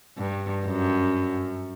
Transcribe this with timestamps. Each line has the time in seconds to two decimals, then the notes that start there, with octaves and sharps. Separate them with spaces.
0.18 G2
0.66 F#2